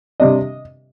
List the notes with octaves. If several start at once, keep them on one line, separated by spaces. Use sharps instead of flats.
C3 G3 D4 D#5